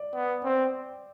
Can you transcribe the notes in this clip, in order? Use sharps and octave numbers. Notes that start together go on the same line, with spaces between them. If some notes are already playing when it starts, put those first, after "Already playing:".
Already playing: D5
B3
C4